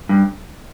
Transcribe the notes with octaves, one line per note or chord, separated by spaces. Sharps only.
G2